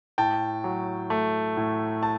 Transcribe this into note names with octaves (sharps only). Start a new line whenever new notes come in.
A2 G5 A5
F#3
A3
A2
A5